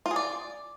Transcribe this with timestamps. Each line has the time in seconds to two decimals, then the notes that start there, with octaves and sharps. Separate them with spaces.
0.06 F4
0.11 G#4
0.16 D5